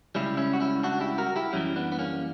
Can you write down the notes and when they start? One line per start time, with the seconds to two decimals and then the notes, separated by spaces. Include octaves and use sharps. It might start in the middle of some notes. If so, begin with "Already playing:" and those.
0.15 C#2 C#3 G3 C#4 E4
0.37 C#4 E4
0.53 F#4
0.60 C#4 E4
0.83 D4 F#4
1.01 E4 G4
1.18 F#4 A#4
1.36 E4 G4
1.53 F#2 E3 G3 C#4 E4
1.76 B3 D4
1.92 B3
1.99 A#3 C#4